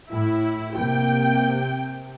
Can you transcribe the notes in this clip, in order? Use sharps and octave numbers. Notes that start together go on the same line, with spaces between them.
A2 E4
C3 A#3 G5